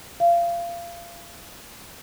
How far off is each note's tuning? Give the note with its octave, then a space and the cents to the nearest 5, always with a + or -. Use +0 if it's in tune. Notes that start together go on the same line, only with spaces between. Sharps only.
F5 -25